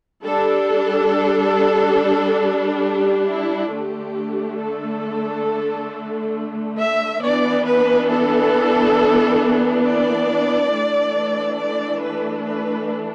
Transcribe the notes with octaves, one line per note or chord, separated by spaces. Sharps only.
G3 D4 A4
G4
E4
D3 A3 D4 G4
A4
E5
E3 B3 D4 D5
B4
A4
D5
E3 A3 D4
D5
B4
B4